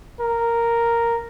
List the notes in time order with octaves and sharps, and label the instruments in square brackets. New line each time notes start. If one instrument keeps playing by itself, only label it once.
[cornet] A#4